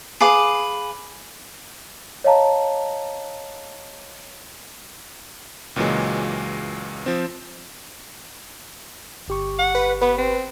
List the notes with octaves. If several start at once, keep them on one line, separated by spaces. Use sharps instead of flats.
G#4 B4 F5 D6
C#5 D#5 F5 A5 A#5
C#2 A#2 E3 F#3 G#3
F3 C4
G1 G4 C#6
F#5
B4
B3 B4
C4